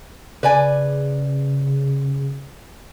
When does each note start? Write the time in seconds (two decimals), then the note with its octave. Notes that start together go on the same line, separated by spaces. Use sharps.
0.43 C#3 B4 D5 G#5